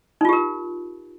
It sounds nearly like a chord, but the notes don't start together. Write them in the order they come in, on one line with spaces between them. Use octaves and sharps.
D#4 F4 G4 A#4